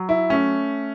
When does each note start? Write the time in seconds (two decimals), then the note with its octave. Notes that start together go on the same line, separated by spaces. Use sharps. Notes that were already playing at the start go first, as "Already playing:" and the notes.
Already playing: F#3
0.09 E4
0.30 A3 C#4